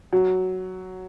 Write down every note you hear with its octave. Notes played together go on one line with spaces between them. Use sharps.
F#3